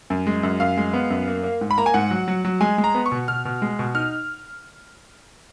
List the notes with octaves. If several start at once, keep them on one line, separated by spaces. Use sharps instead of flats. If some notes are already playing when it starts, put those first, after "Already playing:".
F#2
G#3
F#2
F#2 F5
G#3
B3
F#2
A#3
A#3
G#2
B5
A#3 A#5
G#5
G#2 F#5
F#3
F#3
F#3
G#3 G#5
G#3
A#5
B3
C#6
B2
B2 F6
B2
G#3
B2
D#4 F6